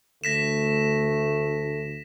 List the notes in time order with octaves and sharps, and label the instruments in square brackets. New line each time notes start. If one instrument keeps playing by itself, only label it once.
[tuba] D2 [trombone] A3 [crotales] A#6 B6 E7